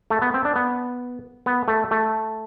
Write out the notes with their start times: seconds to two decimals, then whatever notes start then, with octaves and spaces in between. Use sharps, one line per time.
0.10 A3
0.22 B3
0.34 C4
0.45 D4
0.56 B3
1.46 B3
1.68 A3
1.91 A3